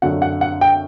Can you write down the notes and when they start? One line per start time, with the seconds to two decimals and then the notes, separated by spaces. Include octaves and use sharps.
0.02 F#2 D3 F#3 F#5
0.22 F#5
0.41 F#5
0.61 G5